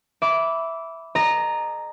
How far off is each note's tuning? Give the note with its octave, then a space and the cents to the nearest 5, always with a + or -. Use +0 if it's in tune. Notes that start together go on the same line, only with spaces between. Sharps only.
E5 +0 B5 +0 D6 -15
A4 -40 D#5 -35 A#5 +0